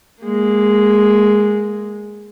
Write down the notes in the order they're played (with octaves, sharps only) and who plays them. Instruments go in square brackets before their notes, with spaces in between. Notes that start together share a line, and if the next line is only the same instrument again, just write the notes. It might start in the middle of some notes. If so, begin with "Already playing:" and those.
[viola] G#3 A#3